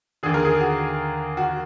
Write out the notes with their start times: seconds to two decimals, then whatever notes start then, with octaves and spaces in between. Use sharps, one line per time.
0.23 D#2 D3 G#4
0.34 A#4
0.45 G#4
0.61 F#4
1.37 F#4